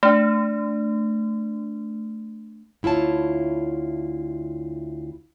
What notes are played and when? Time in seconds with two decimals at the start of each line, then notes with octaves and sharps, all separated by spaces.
0.03 A3 D4
2.83 D2 E4 F4 C#5 A5